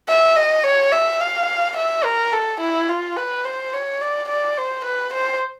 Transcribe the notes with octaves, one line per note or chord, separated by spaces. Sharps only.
E5
D#5
C#5
E5
F5
E5
A#4
A4
E4
F4
B4
C5
C#5
D5
D5
C5
B4
C5